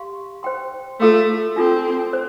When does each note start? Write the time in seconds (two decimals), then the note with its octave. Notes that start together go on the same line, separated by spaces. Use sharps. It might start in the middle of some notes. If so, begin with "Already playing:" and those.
Already playing: G4 F5 C6
0.43 C5 G5 C6
1.00 A3 F4 A4 F5 C6
1.56 C4 D4 F4 A4
2.13 C5